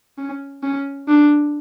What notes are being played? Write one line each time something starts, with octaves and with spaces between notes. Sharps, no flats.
C#4
C#4
D4